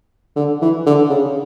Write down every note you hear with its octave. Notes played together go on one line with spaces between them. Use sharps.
D3
E3
D3
C#3